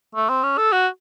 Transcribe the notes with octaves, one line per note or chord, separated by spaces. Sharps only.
A3
C4
C#4
A4
F#4